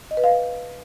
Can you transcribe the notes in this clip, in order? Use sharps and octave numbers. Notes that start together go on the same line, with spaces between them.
D#5
B4
F5